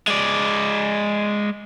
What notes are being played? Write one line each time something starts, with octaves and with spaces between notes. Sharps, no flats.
G#3 D5